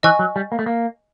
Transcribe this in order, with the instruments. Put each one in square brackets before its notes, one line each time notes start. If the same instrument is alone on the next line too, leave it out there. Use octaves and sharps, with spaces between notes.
[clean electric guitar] E3 [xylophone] D#5 G#5 C#6
[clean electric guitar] F#3
G3
A#3
A3
A#3